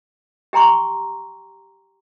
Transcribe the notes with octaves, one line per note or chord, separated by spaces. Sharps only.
G4 G5 A#5 C6 C#6